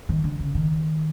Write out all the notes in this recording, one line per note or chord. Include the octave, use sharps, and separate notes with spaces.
D#3
D3
C#3
D#3